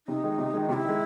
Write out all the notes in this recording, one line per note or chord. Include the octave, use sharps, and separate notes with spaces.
C3 D#4
D#3 G#3
C3
D#3 G#3
C3 E4 F#4
D#3 G#3